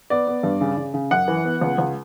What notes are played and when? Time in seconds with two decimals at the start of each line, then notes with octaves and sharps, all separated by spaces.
0.10 B3 D5
0.27 B3
0.43 G2
0.61 C#3
0.77 C#3
0.94 C#3
1.11 F#2 F#5
1.28 E3
1.45 B3
1.61 C#2
1.78 C#2